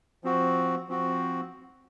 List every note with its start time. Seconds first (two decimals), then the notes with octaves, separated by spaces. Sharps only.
0.24 F3 C4 F#4
0.89 F3 C4 F#4